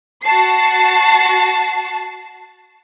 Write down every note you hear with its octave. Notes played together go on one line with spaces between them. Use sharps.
F#4 A5 C7